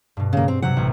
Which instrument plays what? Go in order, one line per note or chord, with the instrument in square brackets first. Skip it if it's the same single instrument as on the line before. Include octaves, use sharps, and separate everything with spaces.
[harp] G2 B2
[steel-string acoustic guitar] C#3 A#3
C4
[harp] C3 F#3 [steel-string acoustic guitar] F#5
[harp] A1